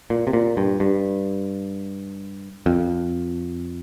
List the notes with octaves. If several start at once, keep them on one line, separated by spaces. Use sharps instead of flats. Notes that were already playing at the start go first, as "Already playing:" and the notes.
A#2
C3
A#2
G2
G2
F2